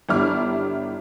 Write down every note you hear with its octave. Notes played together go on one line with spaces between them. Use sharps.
G1 G3 D4 E4 D6 F6